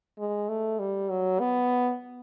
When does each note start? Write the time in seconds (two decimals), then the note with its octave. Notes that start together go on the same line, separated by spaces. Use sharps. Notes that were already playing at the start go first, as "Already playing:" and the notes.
0.18 G#3
0.48 A3
0.79 G3
1.10 F#3
1.40 B3